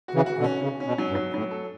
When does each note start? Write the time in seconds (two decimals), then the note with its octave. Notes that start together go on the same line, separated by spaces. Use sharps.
0.08 F#4
0.14 C#3 E3
0.26 F#4
0.38 B2 D3
0.44 C#4
0.61 C#3 C#4
0.80 C#4
0.86 B2
0.98 F#3
1.10 G2
1.15 F#3
1.33 A2 F#3
1.51 A4